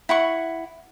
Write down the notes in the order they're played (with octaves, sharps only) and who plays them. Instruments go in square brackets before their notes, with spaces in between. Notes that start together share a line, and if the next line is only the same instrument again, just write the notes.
[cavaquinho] E4 F#5 C#6